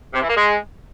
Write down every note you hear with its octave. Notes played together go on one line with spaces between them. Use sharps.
C3
E3
A#3
G#3